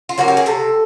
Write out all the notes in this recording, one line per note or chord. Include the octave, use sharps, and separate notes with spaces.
F4
F#3 A#3 C#4 F#4
G4
G#4
C3 A4